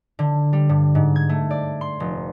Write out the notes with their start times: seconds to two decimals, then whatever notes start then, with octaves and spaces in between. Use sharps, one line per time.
0.19 D3
0.53 G3
0.69 G2
0.95 G#2
1.16 G#6
1.29 A3
1.51 D5
1.81 C6
2.00 F1